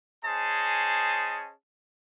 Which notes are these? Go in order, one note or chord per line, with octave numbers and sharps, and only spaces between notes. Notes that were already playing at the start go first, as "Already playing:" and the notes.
C#4 G#4 C5 D#5 A5